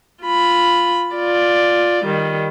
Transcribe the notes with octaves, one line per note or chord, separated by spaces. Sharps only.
F4 B5
F4 D5
D#3 G3